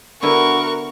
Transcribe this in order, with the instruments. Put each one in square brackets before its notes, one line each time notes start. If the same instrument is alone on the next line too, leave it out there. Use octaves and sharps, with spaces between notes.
[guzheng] D3 B3 E4 [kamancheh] F#4 A#4 [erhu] C#6